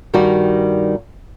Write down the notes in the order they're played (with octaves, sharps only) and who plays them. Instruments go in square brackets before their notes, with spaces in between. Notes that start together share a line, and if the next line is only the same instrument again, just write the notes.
[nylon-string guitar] G2 D#3 G3 D#4 F#4